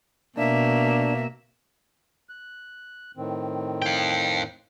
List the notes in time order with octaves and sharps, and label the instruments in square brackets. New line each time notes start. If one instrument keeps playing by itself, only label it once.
[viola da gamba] B2 [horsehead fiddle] A#3 E5 [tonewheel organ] D4
[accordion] F#6
A2 D#3 C4
[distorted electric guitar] F5 G5